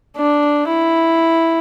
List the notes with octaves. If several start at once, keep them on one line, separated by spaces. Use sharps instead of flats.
D4
E4